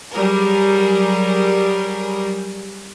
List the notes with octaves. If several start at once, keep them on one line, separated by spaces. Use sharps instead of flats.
F#3 G3 G#4 A#4